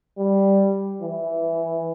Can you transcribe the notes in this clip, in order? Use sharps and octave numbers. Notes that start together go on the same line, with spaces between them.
G3
E3